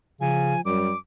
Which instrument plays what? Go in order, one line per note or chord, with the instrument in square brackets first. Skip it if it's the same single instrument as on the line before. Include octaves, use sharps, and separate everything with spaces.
[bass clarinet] C#3 [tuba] F3 [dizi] G#5
[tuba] F#2 [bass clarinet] G3 [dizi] D6